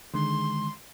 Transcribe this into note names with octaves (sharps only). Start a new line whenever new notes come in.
D3 D#3 G#3 C6